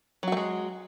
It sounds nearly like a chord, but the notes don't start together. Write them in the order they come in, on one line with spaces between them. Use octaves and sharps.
F#3 F#4 A3 G#3